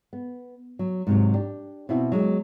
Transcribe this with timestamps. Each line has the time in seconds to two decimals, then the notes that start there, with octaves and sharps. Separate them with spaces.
0.13 B3
0.79 F#3
1.07 G#2 C3 F#3
1.34 D4 G4
1.89 B2 C4 E4 F#4
2.12 F#3 G#3